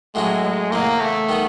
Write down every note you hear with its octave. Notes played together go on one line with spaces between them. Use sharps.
A2 F#3 G#3 A3 C#4
G#3
E2 C#3 E3 A#3
A3
D#3 G3 B3